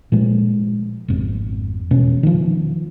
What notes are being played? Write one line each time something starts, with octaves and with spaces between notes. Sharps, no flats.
A#2 F3 G#3
G#1 F2
E1 B2 C#4
D#3 F3